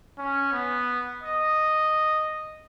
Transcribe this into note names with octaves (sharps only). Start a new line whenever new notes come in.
C#4
B3
D#5